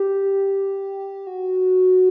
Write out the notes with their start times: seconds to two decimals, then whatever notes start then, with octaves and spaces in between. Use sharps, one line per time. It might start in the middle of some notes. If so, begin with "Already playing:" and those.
Already playing: G4
1.27 F#4